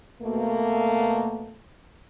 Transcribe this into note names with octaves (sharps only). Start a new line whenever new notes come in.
B2 A3 A#3